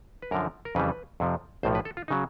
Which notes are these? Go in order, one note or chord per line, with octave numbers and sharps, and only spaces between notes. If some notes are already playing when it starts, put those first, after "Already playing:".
B4
F#2 D3 F3 A#4
A#4
F2 C#3 E3 G3 B4
F2 C3 F3
B1 A2 F3 C5
B4
A4
F4
C#3 F#3 D#4